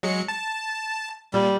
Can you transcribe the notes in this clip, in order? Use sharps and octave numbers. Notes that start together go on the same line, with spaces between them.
F#3 G#3 C#7
A5
A#2 G3